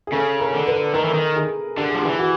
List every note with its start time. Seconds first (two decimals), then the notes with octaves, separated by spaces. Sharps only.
0.07 G#4
0.12 C#3 A4
0.40 A#4
0.54 D3
0.67 B4
0.94 D#3 A#4
1.05 E3
1.14 D#3
1.36 G#4
1.78 D3 G4
1.90 F3 G#4
2.02 E3 G4
2.19 F#4